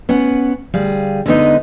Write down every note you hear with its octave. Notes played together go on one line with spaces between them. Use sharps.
B3 C#4 F#5
D2 G3 G#4 F5
D3 G#3 B3 D#4